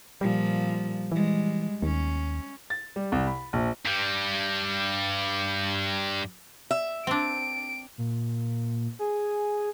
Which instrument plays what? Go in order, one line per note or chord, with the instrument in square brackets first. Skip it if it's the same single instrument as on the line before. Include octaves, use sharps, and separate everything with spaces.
[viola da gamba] A#2 F3 [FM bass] G3
[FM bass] E3 [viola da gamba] G3 G#3
[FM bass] D#2 [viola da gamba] C#4
[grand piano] A6
G3
C2
B5
A#1
[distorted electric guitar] G2 G3
[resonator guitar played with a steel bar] E5
[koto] C4 D4 [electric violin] D7
[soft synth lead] A#2
G#4